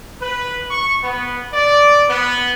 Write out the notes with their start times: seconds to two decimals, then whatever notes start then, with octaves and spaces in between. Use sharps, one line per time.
0.21 B4
0.70 C#6
1.03 B3
1.53 D5
2.09 B3